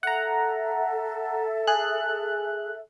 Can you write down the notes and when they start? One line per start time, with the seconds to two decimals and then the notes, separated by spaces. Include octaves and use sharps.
0.03 A4 E5 F#5 A#5
1.67 G#4 F#6